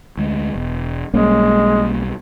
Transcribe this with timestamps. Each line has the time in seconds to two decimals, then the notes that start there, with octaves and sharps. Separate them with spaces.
0.18 D2 G#3
0.55 E1
1.14 B1 G3 G#3 A#3 C#4